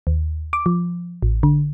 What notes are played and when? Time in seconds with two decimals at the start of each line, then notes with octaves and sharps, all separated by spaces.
0.07 D#2
0.53 D6
0.66 F3
1.23 A1
1.43 D3